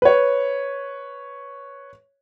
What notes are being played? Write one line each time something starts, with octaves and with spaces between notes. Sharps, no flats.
B4 C#5